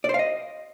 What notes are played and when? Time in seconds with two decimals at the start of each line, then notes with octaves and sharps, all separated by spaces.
0.04 D5
0.09 C5
0.14 F5
0.19 D#5